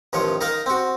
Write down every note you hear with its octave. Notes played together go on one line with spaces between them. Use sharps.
A1 D#3 F3 C#5
D#4 A#4 D#5 F5
C4 F#4